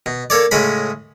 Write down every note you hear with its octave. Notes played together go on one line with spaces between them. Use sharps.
B2
A#3 A4 C#5 D5
A2 C#3 G#3 C#4 B5